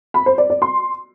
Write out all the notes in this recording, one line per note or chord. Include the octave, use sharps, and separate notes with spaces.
B5
C5
D5
D5
C6